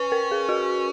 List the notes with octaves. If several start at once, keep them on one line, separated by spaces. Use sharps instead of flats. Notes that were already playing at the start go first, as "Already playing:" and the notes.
Already playing: C#4 B4
A#4
G#4
F#4